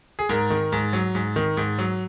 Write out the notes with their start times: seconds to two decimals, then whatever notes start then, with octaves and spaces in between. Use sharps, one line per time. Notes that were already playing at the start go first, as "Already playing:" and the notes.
0.19 G#4
0.29 G#2 A#4
0.50 D#3
0.72 G#2
0.93 F#3
1.15 G#2
1.36 D#3
1.57 G#2
1.78 F#3